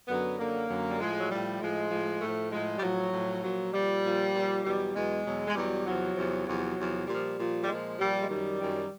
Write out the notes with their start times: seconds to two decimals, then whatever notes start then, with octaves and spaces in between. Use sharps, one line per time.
0.08 F#2 D3 F#3 B3
0.39 F#2 D3 F#3 A#3
0.69 F#2 D3 F#3
0.88 G3
1.00 A2 F3 G#3
1.20 F#3
1.30 A2 F3 G3
1.60 A2 F3 G#3
1.91 A2 F3
2.21 A2 F3 A3
2.52 A2 F3 G#3
2.77 G3
2.82 A2 F3 F#3
3.12 A2 F3
3.43 A#2 F3 F#3
3.73 A#2 F3 G3
4.04 A#2 F3
4.34 A#2 F3
4.64 E2 B2 F#3 G3
4.95 E2 B2 F#3 G#3
5.25 E2 B2 F#3
5.47 G#3
5.55 E2 B2 F#3 G3
5.86 E2 C3 F3 F#3
6.16 E2 C3 F3
6.47 E2 C3 F3 F#3
6.77 E2 C3 F3
7.07 A#2 F3 G3
7.38 A#2 F3
7.63 G3
7.68 A#2 F3 G#3
7.99 A#2 F3 G3
8.23 G#3
8.29 F#2 D#3 F#3 G3
8.60 F#2 D#3 F#3